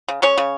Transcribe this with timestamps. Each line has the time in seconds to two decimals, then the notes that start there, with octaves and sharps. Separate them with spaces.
0.08 C#3
0.22 G#3 C#4 C#5
0.38 C#3